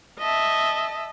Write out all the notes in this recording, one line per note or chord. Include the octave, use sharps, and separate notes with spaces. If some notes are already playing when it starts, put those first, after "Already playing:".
D#5 E5 A5